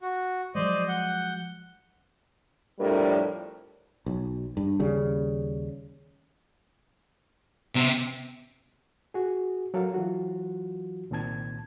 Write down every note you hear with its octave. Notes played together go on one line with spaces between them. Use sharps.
F#4
F3 F#3 G#3 C5 D5 D#5
F#5 G6
F2 A2 G3 D4 A4 A#4
B1
G2
D#2 C#3 G3
C3 B3
F#4 G#4
F#3 A4 A#4 F5
E3 F#3 F4 F#4
C2 A#2 D#3 C4 A5 G#6